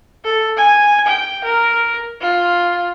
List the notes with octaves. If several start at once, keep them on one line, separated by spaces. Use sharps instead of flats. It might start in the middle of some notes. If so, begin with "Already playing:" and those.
A4
G#5
G5
A#4
F4